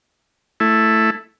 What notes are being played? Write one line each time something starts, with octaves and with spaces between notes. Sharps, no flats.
A3 E4